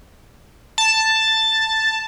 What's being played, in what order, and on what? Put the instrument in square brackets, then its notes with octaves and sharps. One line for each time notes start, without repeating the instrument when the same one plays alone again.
[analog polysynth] A5